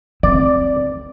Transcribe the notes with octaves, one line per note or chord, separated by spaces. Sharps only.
C4 D5